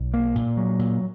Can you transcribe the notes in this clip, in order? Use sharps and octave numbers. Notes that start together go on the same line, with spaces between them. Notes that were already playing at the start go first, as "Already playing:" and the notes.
Already playing: B1
A#3
A#2
F#3
A#2